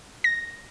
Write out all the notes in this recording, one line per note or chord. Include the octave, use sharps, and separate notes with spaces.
A#6